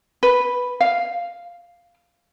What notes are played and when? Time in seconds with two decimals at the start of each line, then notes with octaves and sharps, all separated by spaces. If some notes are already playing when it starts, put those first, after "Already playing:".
0.23 B4
0.81 F5